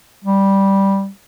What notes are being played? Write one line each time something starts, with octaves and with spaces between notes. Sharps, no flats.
G3